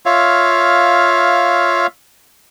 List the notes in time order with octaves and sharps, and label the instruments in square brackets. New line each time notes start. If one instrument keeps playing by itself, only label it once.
[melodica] F4 C#5 E5 F5